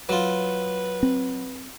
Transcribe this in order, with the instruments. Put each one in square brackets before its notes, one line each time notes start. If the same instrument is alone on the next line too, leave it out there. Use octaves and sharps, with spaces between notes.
[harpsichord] F#3 F4 [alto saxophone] B4
[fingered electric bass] C4